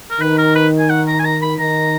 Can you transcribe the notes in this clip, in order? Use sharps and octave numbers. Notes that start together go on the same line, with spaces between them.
A#4
D#3 B4
A#4
B4
G#5
F#5
A#5
G#5
A#5
B5
D#3 A#5